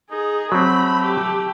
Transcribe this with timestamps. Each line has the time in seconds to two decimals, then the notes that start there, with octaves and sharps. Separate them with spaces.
0.11 D#4 G#4
0.52 F#3 A3 C4 B5
1.04 G4